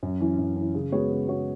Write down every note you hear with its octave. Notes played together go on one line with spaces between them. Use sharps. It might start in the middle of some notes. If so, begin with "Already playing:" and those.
F#2
E3 C#4
F#2
E3 C#4
C#3
G#3 B3 F#4 C#5
C#3
G#3 B3 F#4 C#5